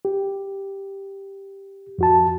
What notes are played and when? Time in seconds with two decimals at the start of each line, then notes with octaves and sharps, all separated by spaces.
0.05 G4
1.99 F2 F#4 A5